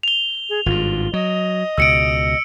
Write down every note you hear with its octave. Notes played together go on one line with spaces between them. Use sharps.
F7 G7
G#4
G#1 G2 F4
F#3 D#5
C#2 B2 E6 C#7 D7